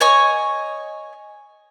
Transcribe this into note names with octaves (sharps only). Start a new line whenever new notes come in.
C#5 D#5 G#5 C#6